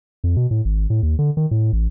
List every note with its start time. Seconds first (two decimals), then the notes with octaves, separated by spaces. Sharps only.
0.24 F2
0.36 B2
0.51 A2
0.65 G#1
0.90 A2
1.03 D#2
1.19 D3
1.37 D#3
1.51 A2
1.73 A1